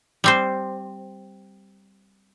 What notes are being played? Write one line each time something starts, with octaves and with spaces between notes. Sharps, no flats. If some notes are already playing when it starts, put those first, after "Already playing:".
G3 C4 C5